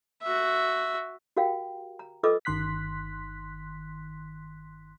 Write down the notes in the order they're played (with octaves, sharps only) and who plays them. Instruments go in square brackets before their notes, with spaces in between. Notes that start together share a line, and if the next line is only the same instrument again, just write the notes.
[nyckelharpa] F#4 E5
[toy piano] F#4 G4 A#4 F5 G5
A#5
F4 A4 B4 D#5 D6 E6
[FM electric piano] G1 D#3 C6 F#6 B6